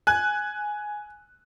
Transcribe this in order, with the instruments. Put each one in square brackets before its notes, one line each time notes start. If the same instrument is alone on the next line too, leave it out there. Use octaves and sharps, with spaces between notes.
[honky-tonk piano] G#5 F#6